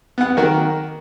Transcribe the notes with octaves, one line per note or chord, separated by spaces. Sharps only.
B3 F#5
D#3 A#3 F#4 A#4